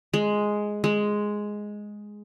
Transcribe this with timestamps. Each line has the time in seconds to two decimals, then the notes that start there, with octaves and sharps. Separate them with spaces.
0.14 G#3
0.84 G#3